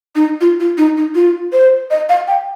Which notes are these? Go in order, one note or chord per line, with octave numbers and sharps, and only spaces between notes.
D#4
F4
F4
D#4
D#4
F4
C5
D#5
F5
G5